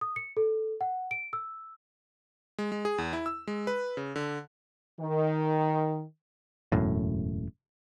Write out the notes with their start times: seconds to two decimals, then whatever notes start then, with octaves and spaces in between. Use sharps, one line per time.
0.01 D#6
0.16 C#7
0.37 A4
0.81 F#5
1.11 D7
1.33 E6
2.58 G#3
2.72 G#3
2.85 G#4
2.98 E2
3.13 E4
3.26 E6
3.47 G#3
3.67 B4
3.97 C#3
4.16 D3
5.00 D#3
6.72 E1 F#2 A2